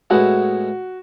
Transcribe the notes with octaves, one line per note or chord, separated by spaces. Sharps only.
A2 G#3 B3 E4 F#4